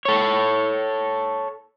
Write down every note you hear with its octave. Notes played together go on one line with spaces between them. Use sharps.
A4 C#5